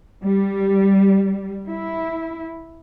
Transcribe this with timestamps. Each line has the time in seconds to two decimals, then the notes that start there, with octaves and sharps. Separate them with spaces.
0.23 G3
1.68 E4